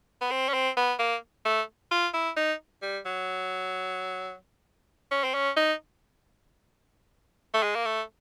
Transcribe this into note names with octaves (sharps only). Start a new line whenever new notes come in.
B3
C4
C#4
C4
B3
A#3
A3
F4
E4
D#4
G3
F#3
C#4
C4
C#4
D#4
A3
G#3
A#3
A3